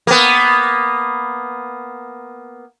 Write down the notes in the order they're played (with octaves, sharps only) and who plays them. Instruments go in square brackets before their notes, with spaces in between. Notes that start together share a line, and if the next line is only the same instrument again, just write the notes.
[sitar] A#3 B3